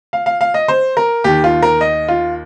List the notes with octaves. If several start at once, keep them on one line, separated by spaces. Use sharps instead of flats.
F5
F5
F5
D#5
C5
A#4
D#2 D#3 G4
F4
A#4
D#5
F4